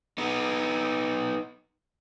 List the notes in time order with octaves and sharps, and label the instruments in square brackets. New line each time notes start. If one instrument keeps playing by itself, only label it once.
[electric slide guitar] B3 D#4